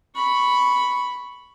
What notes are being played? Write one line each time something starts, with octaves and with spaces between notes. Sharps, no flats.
B5 C#6